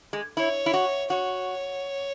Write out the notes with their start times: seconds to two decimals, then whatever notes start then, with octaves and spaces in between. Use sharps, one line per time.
0.13 G#3
0.37 E4 C#5
0.66 E4
0.74 F#4
1.10 F#4 C#5